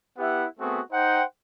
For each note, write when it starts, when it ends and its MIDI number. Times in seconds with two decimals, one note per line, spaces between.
0.18 0.46 59
0.18 0.46 64
0.18 0.46 67
0.18 0.46 76
0.18 0.46 78
0.60 0.80 57
0.60 0.80 59
0.60 0.80 60
0.60 0.80 66
0.60 0.80 68
0.92 1.23 63
0.92 1.23 72
0.92 1.23 78
0.92 1.23 79